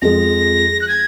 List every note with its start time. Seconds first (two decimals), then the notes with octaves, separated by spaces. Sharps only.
0.01 F2 F3 G#3 A#6
0.81 F#6
0.88 G#6